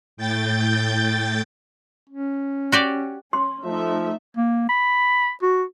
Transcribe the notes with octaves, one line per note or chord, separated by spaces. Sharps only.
A2 G5 G6 A6
C#4
F#4 G4 D5
C#4 C6
F3 A3 D#4 E5
A#3
B5
F#4